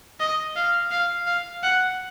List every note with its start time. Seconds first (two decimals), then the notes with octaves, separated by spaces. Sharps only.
0.20 D#5
0.56 F5
0.91 F5
1.27 F5
1.63 F#5